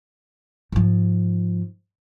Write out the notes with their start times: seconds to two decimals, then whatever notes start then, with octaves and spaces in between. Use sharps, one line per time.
0.72 G#2 F3